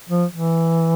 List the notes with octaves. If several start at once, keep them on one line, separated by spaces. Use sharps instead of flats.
F3
E3